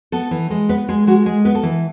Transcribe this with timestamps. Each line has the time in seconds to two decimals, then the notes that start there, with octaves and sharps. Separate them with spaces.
0.12 B3 A4
0.31 E3
0.50 G#3
0.69 B3 B4
0.88 G#3 G#4
1.07 G#3 F#4
1.26 G#3 G#4
1.45 B3 B4
1.55 A4
1.63 E3